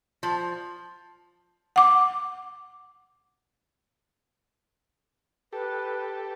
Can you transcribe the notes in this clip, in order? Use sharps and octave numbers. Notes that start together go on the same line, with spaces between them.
F3
F#5 D6
G4 A4 B4